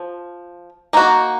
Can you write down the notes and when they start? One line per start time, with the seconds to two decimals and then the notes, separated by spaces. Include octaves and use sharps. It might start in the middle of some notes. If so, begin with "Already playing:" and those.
Already playing: F3
0.93 A#3 D#4 F#4